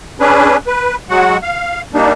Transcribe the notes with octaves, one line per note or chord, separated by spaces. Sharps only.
C#4 D4 G#4 B4
B4
F#3 G#3 F#4 F#5
F5
G3 A#3 D4 D#4